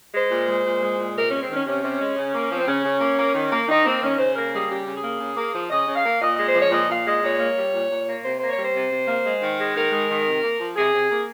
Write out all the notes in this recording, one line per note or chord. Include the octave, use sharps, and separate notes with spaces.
G#3 C5
A#2
G#3
A#2
G#3
A#2
C3 A#4
G#3 C#4
C4
D#3 C#4
C3 C#4
C3
G#3
C#3
A#3
F3
C4
C#3 C#4
C#3
A#3
A#3
D#3
A#3
D#3 D#4
A#3 C4
D#3 C#4
C#3 C5
A#3 A#4
G3 G#4
C#3 G4
C#3
G#4
A#3
C#3
A#3
F3
C#3 D#5
C#3
F5
A#3
A#2 D#5
G#3 D#5
C5
F3
C#5
A#2 D#5
A#2 F5
G#3 D#5
A#2 C#5
A#3
G3
A#2
A#2
A#3
C3 C5
A#3 C5
C#5
G3 C5
C3
C3
A#3
G#3
D#3
G#3
D#3 A#4
G#3
D#3
C3
A#3
F3
C3 G#4
C3
A#3